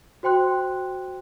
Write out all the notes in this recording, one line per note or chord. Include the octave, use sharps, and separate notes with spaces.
F#4 C5 G5 C6 F#6